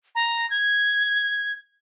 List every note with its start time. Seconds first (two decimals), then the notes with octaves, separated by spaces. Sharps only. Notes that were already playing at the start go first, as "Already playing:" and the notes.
0.15 A#5
0.50 G#6